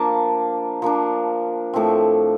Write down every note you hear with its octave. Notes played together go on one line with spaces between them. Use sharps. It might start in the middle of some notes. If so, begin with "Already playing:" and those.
Already playing: F3 A#3 D4 A5
F3 A#3 D4
A2 F3 A3 C4